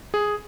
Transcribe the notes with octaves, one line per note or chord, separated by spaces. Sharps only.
G#4